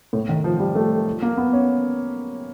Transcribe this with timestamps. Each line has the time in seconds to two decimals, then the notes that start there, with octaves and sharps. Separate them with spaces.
0.13 A2
0.29 D#3
0.44 F3
0.59 G3
0.75 A3
1.22 A#3
1.37 B3
1.53 C#4